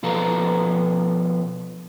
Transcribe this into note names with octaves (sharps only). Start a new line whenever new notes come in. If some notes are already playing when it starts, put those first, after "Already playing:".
B2 F3 A4 B4 F5 A#5